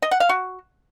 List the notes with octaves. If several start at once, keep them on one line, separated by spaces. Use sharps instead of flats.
D#5
F#5
F5
F#4